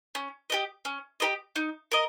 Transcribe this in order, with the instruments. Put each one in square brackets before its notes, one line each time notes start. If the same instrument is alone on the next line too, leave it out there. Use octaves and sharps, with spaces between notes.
[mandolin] C#4
G4 A#4 D#5
C#4
G4 A#4 D#5
D#4
A#4 D#5